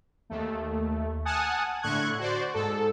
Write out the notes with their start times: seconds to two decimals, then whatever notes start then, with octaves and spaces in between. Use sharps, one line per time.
0.30 D#2 A3
1.25 F#5 G#5 A5 D#6 F6
1.82 A2 D3 C#6 F#6 G#6
2.19 F#4 C5 D5
2.54 G#2 A4